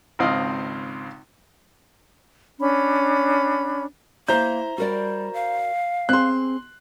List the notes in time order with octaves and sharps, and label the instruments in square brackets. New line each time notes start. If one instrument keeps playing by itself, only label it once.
[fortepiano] G#1 C#2 C4 D#5 F5
[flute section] C#4 D4 B5
[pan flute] A#3 [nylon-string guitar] E4 [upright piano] C5 A#5 G6
[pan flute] G3 [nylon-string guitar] F#4 A#4 D5
[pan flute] F5
[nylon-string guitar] C4 G#4 [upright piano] C6 F#6